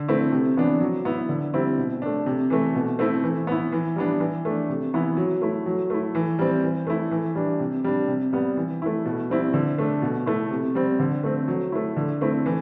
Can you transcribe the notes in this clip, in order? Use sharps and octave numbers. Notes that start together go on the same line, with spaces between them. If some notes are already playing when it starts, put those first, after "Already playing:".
Already playing: D3
A3 C4 E4
C3
E3 B3 D4
F#3
B3 E4
D3
G3 C4 E4
B2
A3 D4
C3
E3 A3
B2
A3 C4 E4
E3
B3 E4
E3
G3 B3 D4
E3
A3 D4
C3
E3 B3 E4
F#3
A3 E4
F#3
A3 E4
E3
G3 C4
E3
A3 E4
E3
G3 D4
C3
G3 D4
C3
G3 B3
E3
A3 E4
B2
G3 C4 E4
D3
A3 D4
B2
A3 E4
C3
G3 C4
D3
A3 C4
F#3
A3 E4
D3
A3 C4 E4
E3